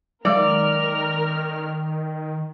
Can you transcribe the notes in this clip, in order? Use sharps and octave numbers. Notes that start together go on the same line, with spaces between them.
D#3 F#3 G#3 A#4 D5 F5 F6